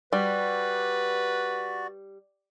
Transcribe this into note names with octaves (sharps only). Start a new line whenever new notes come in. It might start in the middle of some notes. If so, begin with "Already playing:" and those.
G3 F#4 B4 D5